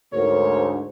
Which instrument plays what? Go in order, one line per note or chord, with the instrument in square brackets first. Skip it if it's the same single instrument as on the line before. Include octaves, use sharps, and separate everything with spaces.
[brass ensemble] D2 G#2 [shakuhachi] A#4 [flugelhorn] C#5